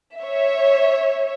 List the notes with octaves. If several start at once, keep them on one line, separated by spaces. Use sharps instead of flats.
C#5 E5